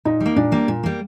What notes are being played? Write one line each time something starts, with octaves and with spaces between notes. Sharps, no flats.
A#2 D#4
G3
A#3
A#2 D4
G3 A#3
A#2
G3 A#3